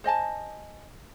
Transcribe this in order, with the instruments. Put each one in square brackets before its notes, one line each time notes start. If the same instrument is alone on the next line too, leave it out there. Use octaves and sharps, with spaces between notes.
[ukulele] C5 D#5 G#5 A5